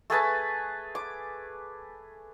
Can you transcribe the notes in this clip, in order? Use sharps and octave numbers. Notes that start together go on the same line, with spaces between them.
A3 G#4 B4 A5
D6